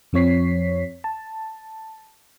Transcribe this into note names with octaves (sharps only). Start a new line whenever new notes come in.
F2 F3 C4 C#5 B6 C7
A5